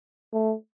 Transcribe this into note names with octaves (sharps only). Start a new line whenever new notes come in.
A3